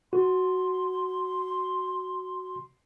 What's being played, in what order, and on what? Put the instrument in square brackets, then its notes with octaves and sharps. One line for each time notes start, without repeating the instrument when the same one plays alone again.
[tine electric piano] F#4 [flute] C6